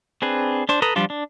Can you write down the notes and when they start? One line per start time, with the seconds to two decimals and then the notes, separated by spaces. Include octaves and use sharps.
0.22 C4 D4 G#4 B4
0.69 D4 C5
0.82 A4 B4 A#5 D#6
0.96 F3 G3 D4 F4
1.10 D4